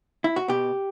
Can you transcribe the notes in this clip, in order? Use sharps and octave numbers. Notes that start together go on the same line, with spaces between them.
E4
F#4
B2 G4